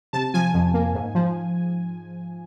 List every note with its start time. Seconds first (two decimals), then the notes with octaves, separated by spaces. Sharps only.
0.13 C3 A5
0.34 F3 G#5
0.54 F2
0.74 A#3
0.95 G#2
1.15 F3